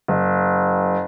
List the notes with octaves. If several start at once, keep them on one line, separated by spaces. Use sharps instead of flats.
F#1